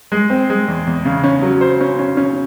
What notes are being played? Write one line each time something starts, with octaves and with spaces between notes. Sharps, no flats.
G#3
C4
G#3
E2
E2
C#3
C#4
F#3
C5
C#4
C#4
C#4